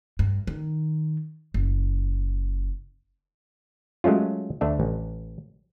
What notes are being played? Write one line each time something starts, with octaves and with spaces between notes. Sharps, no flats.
G2
D#3
F#1
F#3 G#3 A3 C#4 F4
D2 A3 D4 E5
A1